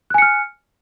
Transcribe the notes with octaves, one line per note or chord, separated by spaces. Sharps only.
G#5 F6 F#6 C#7